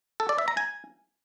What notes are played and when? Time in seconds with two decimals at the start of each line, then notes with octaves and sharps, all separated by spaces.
0.20 A4
0.29 D5
0.38 E5
0.48 A#5
0.57 G#5